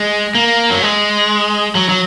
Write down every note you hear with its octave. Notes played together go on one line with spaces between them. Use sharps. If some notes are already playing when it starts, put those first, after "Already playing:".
Already playing: G#3
A#3
F#3
G#3
F#3
F#3